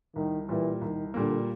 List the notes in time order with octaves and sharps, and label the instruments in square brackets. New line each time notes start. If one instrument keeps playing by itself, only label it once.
[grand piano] C2 [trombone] D#3
[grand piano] A#2 G3 A#3 [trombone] E3
[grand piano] C2 [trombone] D#3
[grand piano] A#2 G3 A#3 [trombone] D3